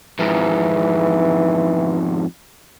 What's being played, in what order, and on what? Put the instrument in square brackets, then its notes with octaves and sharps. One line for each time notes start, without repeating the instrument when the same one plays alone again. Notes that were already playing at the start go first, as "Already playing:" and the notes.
[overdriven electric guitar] F2 G#2 [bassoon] E3